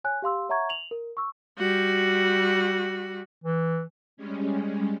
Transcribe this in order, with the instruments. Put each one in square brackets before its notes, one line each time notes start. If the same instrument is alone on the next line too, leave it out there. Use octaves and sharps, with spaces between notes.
[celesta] C#5 G#5 F#6
G4 F5 C6 E6
C#5 E5 F#5 A#5 C#6 G#6
F7 F#7
A#4
C#6 E6
[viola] G3 F#4
[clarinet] E3
[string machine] G3 G#3 C#4